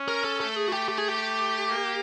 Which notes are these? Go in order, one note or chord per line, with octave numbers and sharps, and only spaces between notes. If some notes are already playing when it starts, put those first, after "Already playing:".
Already playing: C#4
A#4
A4
A3 A4
G#4
F#4
G4
G4
G#4
G4
A#3